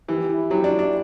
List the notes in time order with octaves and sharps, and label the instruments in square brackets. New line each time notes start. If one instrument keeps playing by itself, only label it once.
[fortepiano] E3 [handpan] G4
[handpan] E4
[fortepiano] F#3 [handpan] G4
[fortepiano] D4
[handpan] E4
[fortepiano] D4